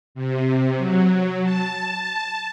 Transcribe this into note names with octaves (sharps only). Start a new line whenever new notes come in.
C3
F#3
A5